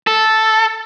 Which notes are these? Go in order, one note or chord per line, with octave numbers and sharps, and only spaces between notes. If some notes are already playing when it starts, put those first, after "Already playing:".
A4